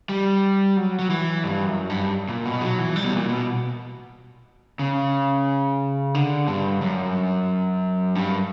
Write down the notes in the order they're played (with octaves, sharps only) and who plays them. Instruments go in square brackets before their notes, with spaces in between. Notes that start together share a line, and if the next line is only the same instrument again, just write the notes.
[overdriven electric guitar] G3
F#3
F#3
E3
G2
F#2
G2
A#2
B2
F#3
E3
G3
B2
A#2
B2
C#3
D3
G2
F#2
G2